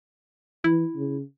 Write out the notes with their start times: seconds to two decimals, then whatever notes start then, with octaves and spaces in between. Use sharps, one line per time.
0.64 E3 E4
0.96 C#3